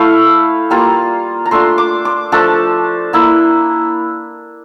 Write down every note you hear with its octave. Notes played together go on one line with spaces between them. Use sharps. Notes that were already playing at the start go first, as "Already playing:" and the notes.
Already playing: A3 E4 F5
G3 A#3 F4 A#5
A#5
A3 D4 F4 C6
D6
D6
F3 A3 D4 A5
A#3 E4